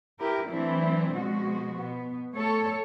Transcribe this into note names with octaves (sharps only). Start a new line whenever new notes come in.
E4 G4 A#4 B4
E3 F#3 A3 C4 D4 E4
B2 F3 G#3 F#4
B2 B3
A3 A4 C#5